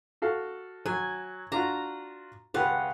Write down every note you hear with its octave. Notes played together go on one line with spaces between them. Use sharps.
F#4 A4 F5
F#3 G#5
D4 F4 F#4 A#5
C#2 G4 B4 F5 F#5